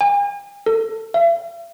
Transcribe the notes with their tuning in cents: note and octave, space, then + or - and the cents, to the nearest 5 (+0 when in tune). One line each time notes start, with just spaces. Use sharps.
G#5 -45
A4 +25
E5 +45